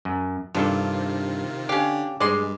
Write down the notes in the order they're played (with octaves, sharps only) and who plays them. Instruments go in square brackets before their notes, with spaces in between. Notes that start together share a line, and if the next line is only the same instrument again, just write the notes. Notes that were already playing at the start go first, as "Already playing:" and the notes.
[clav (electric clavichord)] F#2
[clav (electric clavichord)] G2 D4 A4 [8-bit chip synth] C3 D#3 F4 [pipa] F3
[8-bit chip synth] D3 D4 [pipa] C#4 F5 [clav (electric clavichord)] G4
[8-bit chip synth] G2 [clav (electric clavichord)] G#3 [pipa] D5 C6